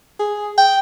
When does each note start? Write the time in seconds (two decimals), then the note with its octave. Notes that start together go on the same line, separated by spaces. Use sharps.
0.19 G#4
0.58 G5